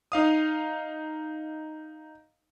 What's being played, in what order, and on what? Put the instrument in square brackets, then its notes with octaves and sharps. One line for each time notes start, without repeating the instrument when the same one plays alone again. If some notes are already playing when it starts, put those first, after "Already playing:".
[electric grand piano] D#4 F5 D#6